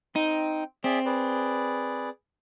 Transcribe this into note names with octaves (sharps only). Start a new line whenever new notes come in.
C4 D#4 G5
C4 G#4 D5 E5
G#4 B4 D5